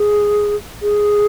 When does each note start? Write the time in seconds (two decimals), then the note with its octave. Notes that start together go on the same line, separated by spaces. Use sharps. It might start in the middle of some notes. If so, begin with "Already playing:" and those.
Already playing: G#4
0.82 G#4